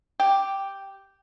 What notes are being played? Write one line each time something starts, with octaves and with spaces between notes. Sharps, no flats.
G4